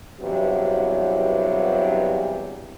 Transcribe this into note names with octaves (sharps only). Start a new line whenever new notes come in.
E2 G2 C3 E3 F#3